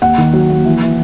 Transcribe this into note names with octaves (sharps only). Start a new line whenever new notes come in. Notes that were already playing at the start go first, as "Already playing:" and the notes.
D#2 F#5
D#3
F#3
A#3
E3
E3